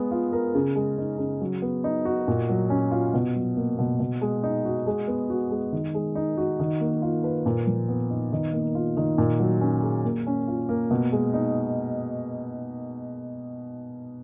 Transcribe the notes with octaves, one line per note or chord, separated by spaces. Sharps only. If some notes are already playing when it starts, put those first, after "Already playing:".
Already playing: G#3 B3
F4
A#4
C#3
G#3
D#4
C#3
F#3
B3
D#4
F#4
A#2
F#3
C#4
F4
B2
F#3
A#3
B2
B2
G#3
D#4
F#4
G#3
B3
F#4
G#3
D#3
G#3
D#4
F#4
D#3
A#3
F4
B4
A#2
F3
B3
D#4
D#3
A#3
F4
D#3
A#2
F#3
C#4
G#4
A#3
C#4
F4
A#3
B2
G#3
D#4